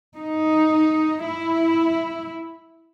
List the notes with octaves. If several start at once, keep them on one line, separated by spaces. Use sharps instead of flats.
D#4
E4